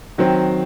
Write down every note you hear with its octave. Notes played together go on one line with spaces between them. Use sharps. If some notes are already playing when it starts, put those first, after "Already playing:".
D#3 F#3 C4